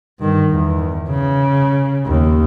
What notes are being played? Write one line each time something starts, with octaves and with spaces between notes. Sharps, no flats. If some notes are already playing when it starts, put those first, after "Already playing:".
G2 D#3
E2
C#3
D#2